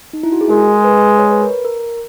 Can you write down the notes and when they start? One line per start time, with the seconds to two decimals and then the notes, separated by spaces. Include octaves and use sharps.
0.13 D#4
0.23 E4
0.32 F#4
0.41 G#4
0.50 G#3 A#4
0.84 B4
1.18 C#5
1.31 B4
1.42 A#4
1.65 A#4